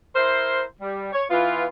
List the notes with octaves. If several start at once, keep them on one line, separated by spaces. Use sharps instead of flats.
E4 A#4 C5
G3
C#5
E3 B3 F4